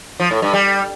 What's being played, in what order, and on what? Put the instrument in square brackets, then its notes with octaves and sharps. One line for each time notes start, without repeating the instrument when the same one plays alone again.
[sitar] F3
A2
G2
G3